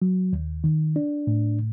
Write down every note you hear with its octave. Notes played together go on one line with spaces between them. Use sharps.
F#3
D#2
D#3
D4
A2